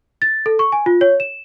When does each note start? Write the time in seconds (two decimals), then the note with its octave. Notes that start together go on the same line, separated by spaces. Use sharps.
0.22 A6
0.46 A4
0.59 C#6
0.72 G#5
0.86 F4
1.01 C#5
1.20 E7